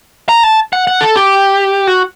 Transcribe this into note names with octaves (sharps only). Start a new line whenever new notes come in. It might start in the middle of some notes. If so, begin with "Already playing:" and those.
A#5
A5
F#5
F#5
A4
G4
F#4